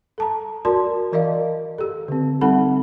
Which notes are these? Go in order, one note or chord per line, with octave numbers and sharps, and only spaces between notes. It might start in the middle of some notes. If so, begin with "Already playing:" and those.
A4 A5 A#5
F#4 A#4 D5 A5 C6
E3 A#4 D5 D#5 F5
G4 A4
D3 C4
G3 C4 D#4 A4 F#5 B5